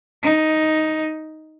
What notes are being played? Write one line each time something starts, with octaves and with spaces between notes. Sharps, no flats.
D#4